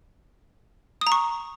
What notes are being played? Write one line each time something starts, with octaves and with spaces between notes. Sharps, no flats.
D#6
A#5
C#6